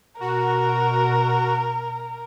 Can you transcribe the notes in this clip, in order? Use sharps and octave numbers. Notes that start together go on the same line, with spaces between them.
B2 F#4 A#4